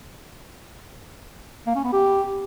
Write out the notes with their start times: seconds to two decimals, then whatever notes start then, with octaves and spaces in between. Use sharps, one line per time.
1.67 A#3
1.75 C#4
1.84 B3
1.93 G4